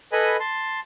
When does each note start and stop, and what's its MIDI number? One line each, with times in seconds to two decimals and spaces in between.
0.12 0.37 69
0.12 0.37 71
0.12 0.37 75
0.12 0.37 80
0.12 0.37 83
0.40 0.80 81
0.40 0.80 84